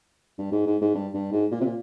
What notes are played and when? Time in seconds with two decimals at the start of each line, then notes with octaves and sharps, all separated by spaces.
0.38 G2
0.52 G#2
0.66 G#2
0.81 G#2
0.95 G2
1.14 G2
1.32 G#2
1.51 A#2
1.61 C3
1.65 A#2